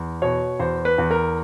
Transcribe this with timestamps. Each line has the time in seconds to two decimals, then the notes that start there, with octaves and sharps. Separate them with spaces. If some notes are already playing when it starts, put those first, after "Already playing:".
Already playing: E2
0.22 B2 C#5
0.60 E2 C5
0.85 B4
0.98 E2
1.11 A#4